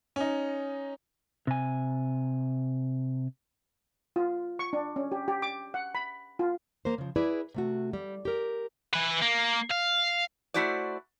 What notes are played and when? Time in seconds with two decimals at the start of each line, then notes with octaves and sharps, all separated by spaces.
0.16 C#4 D#4
1.47 C3 G#5
4.16 F4
4.59 C#6
4.73 D4
4.96 C#4
5.12 G4
5.28 G4
5.42 D6
5.74 F#5
5.95 B5
6.39 F4
6.85 A#3 A#4 C5
6.98 C#3 F3
7.16 E4 G#4 B4 D5
7.54 C3 A3 F#4
7.93 G3
8.25 G4 A#4
8.93 E3 B4
9.22 A#3
9.70 F5
10.54 A3 E4 F#4 C5 D5